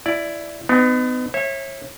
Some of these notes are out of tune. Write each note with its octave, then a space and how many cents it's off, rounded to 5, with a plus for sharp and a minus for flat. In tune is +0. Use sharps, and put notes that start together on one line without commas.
E4 +10 D5 +0
B3 +35 D#4 -20
C#5 -30 E5 +0